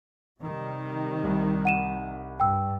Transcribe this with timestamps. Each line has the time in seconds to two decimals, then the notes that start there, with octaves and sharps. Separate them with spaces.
0.42 C3 D#3 G3
1.24 C2
1.65 F#5 D#7 E7
2.40 G2 G5 E6